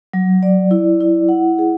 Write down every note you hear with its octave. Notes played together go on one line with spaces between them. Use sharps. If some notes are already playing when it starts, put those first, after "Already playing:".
F#3
D5
E4
E4
F#5
G#4